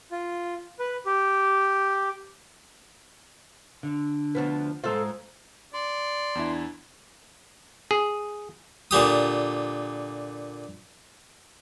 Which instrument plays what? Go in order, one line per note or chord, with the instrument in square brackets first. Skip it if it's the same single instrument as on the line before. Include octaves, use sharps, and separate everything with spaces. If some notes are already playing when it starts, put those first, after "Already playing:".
[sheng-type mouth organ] F4
B4
G4
[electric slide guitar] D3
[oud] D2 F3 B3
[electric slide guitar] G#3 C5 [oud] F4 A4
[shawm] D5 [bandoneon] C6
[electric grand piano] E2 D4 E4
[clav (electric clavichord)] G#4
[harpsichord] A#2 D3 G4 D#6